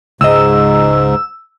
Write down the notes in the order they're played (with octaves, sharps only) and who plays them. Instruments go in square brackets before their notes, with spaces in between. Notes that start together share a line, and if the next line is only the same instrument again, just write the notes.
[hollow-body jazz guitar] C#2 D#5 [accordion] G#2 [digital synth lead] E6